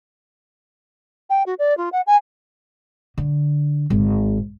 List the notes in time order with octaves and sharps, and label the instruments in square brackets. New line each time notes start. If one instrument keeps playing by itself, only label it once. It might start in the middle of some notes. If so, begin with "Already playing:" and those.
[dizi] G5
F#4
D5
F4
F#5
G#5
[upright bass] D3
G#1